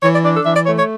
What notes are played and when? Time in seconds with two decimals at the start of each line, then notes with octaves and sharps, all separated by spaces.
0.03 E3 C#5
0.13 D5
0.24 D4 D5
0.34 A4
0.45 E3 E5
0.55 D5
0.66 A3 C#5
0.78 C#5